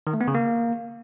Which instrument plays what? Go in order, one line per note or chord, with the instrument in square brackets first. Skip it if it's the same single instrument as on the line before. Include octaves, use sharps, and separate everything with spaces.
[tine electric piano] D#3
A3
B3
C#3
A#3